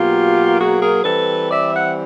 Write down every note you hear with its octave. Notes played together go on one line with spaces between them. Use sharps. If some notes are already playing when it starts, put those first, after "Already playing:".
Already playing: B2 F#3 A#3 F4 G4
F#4 G#4
G#4 A#4
E3 G3 C4 A4 B4
D5 E5
E5 F#5